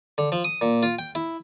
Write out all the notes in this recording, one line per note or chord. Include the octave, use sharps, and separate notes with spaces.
D3
F3
D#6
A#2
F4
G5
E4